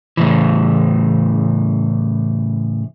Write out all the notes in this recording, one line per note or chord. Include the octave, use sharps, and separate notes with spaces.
A2 C#3 E3